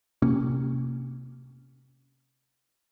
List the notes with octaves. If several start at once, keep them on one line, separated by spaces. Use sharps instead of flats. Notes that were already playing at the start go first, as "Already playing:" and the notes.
C3 A#3 C#4